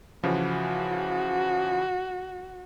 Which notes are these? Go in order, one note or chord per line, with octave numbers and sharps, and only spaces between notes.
C#3 E3 F3 F#4